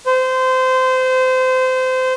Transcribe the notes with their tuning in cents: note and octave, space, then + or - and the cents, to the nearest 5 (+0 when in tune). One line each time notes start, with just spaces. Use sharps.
C5 -25